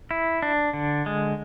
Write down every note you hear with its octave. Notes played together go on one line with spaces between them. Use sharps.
E4
D4
D3
G#3